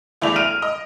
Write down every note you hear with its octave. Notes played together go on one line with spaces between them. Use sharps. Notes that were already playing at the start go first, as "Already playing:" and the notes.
E2 A3 E4 A4 D5 F7
F6 D7 D#7 F7
D#5